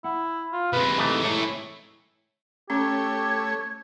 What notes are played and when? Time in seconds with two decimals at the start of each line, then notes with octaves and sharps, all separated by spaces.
0.04 E4 F#5
0.53 F4
0.73 C3 G#3 B4
0.98 E3 A3 D#4 E5
1.24 E4 C#5
2.70 A3 C#4 G4 C#5 G#6